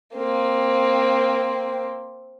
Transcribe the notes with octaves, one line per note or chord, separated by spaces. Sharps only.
A#3 C4